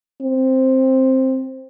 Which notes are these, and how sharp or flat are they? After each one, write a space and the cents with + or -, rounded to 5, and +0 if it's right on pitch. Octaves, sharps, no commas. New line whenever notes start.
C4 +5